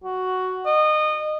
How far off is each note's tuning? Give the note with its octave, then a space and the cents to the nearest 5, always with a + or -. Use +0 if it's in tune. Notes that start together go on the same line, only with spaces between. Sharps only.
F#4 +5
D#5 -25